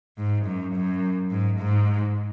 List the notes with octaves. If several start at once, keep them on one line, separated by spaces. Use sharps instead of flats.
G#2
F#2
F#2
G#2
G#2